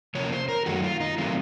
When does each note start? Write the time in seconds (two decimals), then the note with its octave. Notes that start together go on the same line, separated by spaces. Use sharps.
0.15 C3 F3 A#3 C#4 C#5
0.32 C5
0.49 A#4
0.66 F#2 D#3 F#3 A3 F#4
0.84 F4
1.00 D#4
1.18 D#3 F#3 A3 C4 F4